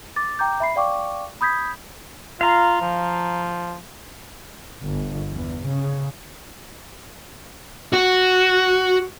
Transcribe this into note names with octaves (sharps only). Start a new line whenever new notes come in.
D6 A6
G5 A#5 D6 G6
E5 B5 C7
D5 F5 G5 C#6 D6
B5 D#6 G6 G#6 B6
F4 F5 A#5
F3
G1
E2
C#3
F#4